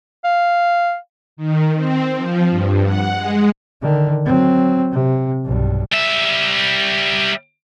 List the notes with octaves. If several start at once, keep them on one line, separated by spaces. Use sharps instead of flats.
F5
D#3
C4
F3
G2
F#5
G#3
D3 D#3
F#3 C4
C3
B1 G2
G3 E5